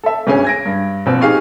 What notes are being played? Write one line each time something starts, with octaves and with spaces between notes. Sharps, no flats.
A4 E5
G1 D2 C#4 G#4 G#5
G#6 A#6 D7
G2
A#1 B2 C4
D#4 G4 G#4 F5 G#5 C#6